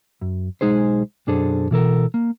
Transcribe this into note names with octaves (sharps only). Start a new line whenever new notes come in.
F#2
B1 G#3 D#4 G#4 C5
B1 F#2 D4 G#4 A4 C5
B2 E3 A4 A#4
A#3